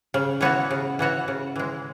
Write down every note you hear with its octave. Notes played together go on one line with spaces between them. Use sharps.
C#3
E3 B3 F#4 C#5
C#3
E3 B3 F#4 C#5
C#3
E3 G#3